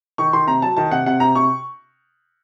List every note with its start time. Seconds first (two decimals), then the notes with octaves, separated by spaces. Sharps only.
0.18 D#3 C#6
0.33 D#3 C6
0.47 C3 A#5
0.62 F#3 A5
0.77 D#3 A5
0.91 C3 F#5
1.06 C3 F#5
1.20 C3 A#5
1.35 C3 C#6